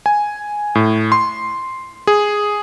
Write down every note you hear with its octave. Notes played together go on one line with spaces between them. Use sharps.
G#5
A2
C6
G#4